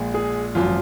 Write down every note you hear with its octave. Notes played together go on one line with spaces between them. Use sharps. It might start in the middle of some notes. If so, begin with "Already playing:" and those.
Already playing: A#1 A#2 G#3
G#4
G#1 F#2 F3 F4